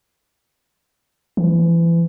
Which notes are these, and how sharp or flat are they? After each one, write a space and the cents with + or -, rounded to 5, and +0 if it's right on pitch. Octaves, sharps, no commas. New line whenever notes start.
E3 +30